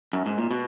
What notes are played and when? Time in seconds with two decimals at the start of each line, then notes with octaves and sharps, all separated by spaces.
0.13 F#2
0.26 G#2
0.38 A#2
0.51 B2